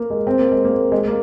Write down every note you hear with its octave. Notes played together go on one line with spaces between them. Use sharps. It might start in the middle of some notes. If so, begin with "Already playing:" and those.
Already playing: A#3
G#3
C4
A#3
G#3
A#3
G#3
A#3